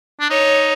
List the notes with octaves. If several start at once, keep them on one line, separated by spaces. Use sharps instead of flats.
D4
D#4 C#5